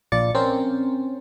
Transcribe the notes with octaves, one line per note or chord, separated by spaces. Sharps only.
A#1 F4 D5 A6 C#7
C4 C#4 A#4 C5